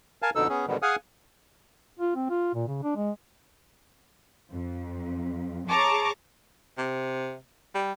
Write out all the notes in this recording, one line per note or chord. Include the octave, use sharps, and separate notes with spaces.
A#4 F5 G#5 A5
F2 B2 D3 D#4 A4 E6
B3 C#4 G#4
G#2 B2 D3 D#3 G3 B3
G#4 F5 F#5 G#5 D#6 F6
F4
C4
F4
A#2
C#3
D4
G#3
F2
G#4 C#5 A5 A#5 C#6 D6
C3
G3